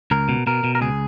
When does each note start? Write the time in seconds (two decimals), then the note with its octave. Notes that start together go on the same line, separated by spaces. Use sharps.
0.11 C#2 A#4
0.29 B2
0.47 B2 A#4
0.64 B2
0.75 A#4
0.81 C#2 G#4